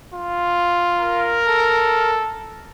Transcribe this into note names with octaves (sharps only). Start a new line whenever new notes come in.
F4
A#4
A4